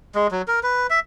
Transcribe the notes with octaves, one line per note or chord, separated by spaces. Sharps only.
G#3
F#3
A#4
B4
E5